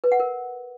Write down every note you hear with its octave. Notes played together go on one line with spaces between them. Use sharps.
B4
F#5
A#4